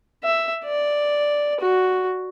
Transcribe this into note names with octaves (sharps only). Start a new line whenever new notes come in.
E5
D5
F#4